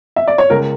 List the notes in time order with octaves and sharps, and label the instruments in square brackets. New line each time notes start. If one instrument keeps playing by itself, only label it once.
[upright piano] E5
D5
C#5
C#2 A#4